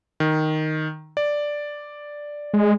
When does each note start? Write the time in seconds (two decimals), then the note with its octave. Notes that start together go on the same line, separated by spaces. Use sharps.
0.20 D#3
1.17 D5
2.54 G#3